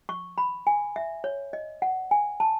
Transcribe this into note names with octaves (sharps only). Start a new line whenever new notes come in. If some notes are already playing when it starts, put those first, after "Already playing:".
C#6
B5
G#5
E5
C#5
D#5
F#5
G#5
A5